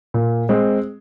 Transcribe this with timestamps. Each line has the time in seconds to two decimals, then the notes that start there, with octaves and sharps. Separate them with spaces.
0.14 A#2
0.49 G#3 C4